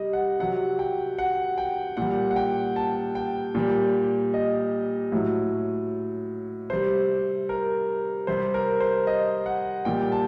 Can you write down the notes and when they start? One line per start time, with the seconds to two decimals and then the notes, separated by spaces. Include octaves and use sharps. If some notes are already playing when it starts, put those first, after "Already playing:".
Already playing: C3 G3 D#5
0.13 F#5
0.40 C3 F#3 F#5
0.79 G5
1.18 F#5
1.58 G5
1.97 A#2 G3 F#5
2.31 F#5
2.36 G5
2.76 A5
3.15 G5
3.55 A#2 G3
4.34 D#5
5.12 A2 F#3
6.70 C3 G3 C5
7.49 A#4
8.27 C3 G3 C5
8.54 A#4
8.80 C5
9.07 D#5
9.46 F#5
9.85 A#2 G3 G5
10.12 A5